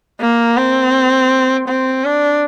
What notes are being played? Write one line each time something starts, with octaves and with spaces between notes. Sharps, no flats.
A#3
C4
C4
D4